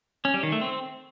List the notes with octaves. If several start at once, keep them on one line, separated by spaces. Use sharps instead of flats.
C#4
G3
D#3
A3
C4